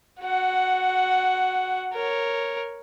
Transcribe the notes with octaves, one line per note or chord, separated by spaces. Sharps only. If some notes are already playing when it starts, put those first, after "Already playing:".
F#4 F#5
A#4 C#5